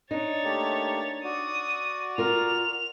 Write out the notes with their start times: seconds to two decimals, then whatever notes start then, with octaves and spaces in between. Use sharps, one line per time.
0.11 D4 D#4 C#5 A6
0.44 A3 A#3 G4
1.24 F#4 D5 D#6
2.18 F4 A#4 F7